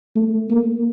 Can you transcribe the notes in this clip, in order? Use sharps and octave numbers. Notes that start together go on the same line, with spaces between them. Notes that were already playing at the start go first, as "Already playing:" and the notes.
A3
A#3